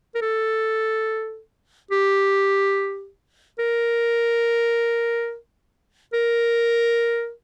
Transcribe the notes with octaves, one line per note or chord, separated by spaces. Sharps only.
A#4
A4
G4
A#4
A#4